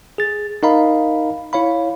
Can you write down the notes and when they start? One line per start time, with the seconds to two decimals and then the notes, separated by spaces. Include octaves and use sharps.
0.18 G#4 A6
0.63 D#4 A#4 D#5 F5 A#5 B5
1.53 E4 C#5 F5 B5